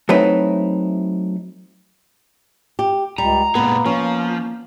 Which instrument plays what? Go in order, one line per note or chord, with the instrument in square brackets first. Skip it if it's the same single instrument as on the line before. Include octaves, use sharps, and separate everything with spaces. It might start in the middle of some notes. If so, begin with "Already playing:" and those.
[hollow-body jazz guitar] F#3 A3 C4 D#4 E4 B4
[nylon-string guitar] G4
[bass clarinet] C#2 [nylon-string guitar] G3 [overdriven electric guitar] A#5
[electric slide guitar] A#2 G#3 [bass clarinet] A#3 [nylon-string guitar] B3
[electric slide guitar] F3 [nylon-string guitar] C#4